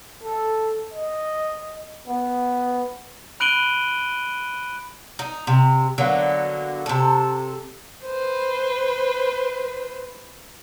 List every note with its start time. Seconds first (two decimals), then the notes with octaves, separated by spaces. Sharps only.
0.23 A4
0.93 D#5
2.07 B3
3.40 B5 F#6 D7 D#7 F#7 G7
5.19 D#4
5.47 C3
5.98 D3 F#3 A#3 B3
6.86 C3 A4
8.04 B4 C5